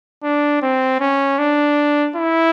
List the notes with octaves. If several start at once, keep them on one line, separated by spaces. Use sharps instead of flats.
D4
C4
C#4
D4
E4